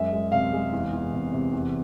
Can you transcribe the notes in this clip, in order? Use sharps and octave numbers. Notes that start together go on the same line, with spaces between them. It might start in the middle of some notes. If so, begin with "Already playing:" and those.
Already playing: F#2 G#3 E5
G#3
C3 F5
G#3
E2
E2
C3
C3
E2